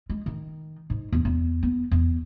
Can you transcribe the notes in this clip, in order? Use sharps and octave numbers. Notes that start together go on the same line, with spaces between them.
G#3
D#3
G#2
E2
E2
B3
E2